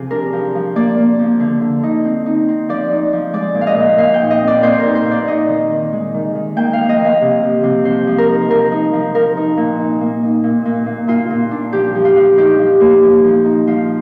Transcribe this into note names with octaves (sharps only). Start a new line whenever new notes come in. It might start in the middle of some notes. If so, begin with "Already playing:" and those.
Already playing: C3 F3 G#4
D4 A#4
F3
F3
A#3 D5
A#3
F3
D3
D3
D#4
C4
D#4
C4
F3 D5
D#4
F3
G#3 D5
A#2
F5
D#5
A#2
A#2 F5
G5
D#4
D#5
C4
D5
A#2 C5
D#4 A#4
C5
A#2
D5
D#4 D#5
D#3
D#3
G#3
D#3
D#3
A#3 G5
F5
F3
D#5
A#3 F5
C3
F3
C3
F3 C5
F3
A#4
D#4
F3 A#4
D#4
F3
F3 A#4
D#4
A#2
D#4
A#3
D#4
A#2
A#2
A#2
A#2 F4
A#2
D4
F3 G4
F3
F4
F3
D#4 G4
F3
A#3
F3
F3
D#4
F3 F4